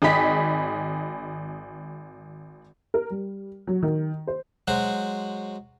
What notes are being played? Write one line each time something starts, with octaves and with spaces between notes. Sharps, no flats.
G#1 G#4 D#5 G5 B5 B6
A#4
G3
F#3
D#3
C5
F#3 G#3 F#4 C5